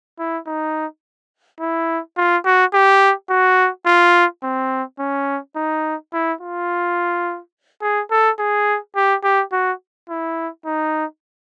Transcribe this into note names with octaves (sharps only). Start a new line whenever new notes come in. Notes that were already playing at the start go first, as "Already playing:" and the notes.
E4
D#4
E4
F4
F#4
G4
F#4
F4
C4
C#4
D#4
E4
F4
G#4
A4
G#4
G4
G4
F#4
E4
D#4